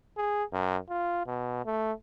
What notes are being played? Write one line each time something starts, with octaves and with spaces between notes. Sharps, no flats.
G#4
F#2
F4
B2
A3